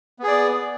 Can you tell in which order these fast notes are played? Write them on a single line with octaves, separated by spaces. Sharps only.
B3 G#4 D5